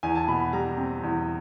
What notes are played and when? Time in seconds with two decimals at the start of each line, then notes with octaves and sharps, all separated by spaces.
0.03 E2 G#5
0.15 A5
0.28 B2 B5
0.40 B5
0.53 G3 A#5
0.78 C4
1.03 E2